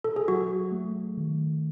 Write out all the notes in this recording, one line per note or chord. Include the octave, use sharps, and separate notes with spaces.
A4
G#4
F#3 F#4
A3
D#3